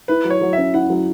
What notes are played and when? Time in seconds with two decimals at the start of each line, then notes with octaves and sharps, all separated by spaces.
0.08 E4 B4
0.25 F#3
0.30 C#5
0.41 F#3
0.53 C#4 E5
0.74 E4 F#5
0.90 F#3